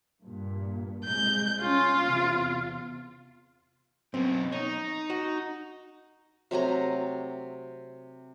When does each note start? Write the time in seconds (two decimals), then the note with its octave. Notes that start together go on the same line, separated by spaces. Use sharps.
0.23 G2 A#2
1.05 C2 G#3 G6
1.62 C#4 F4
2.02 E2 C3
4.14 F#2 B2 C4
4.52 D#4 C#5
5.10 F#4
6.51 C3 F#3 A3 A#5